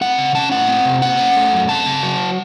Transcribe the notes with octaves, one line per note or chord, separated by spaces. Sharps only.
C4 F#5
C#3
C#4 A5
A2 F#5
C4
C3
A#3 F#5
C#4
A3
F#2
C4 A5
C#3
F#3